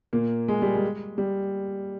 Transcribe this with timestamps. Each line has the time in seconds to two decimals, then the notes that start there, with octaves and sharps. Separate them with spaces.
0.13 A#2 A#3
0.48 G#3
0.62 G3
0.75 G#3
1.18 G3